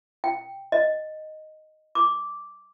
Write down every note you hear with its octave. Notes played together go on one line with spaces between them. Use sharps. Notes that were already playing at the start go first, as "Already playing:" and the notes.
G5
D#5
D6